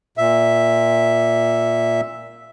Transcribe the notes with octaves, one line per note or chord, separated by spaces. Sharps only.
A#2 E5